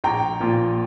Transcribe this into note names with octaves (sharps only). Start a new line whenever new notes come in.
A#1 G5 A#5
A#2 F3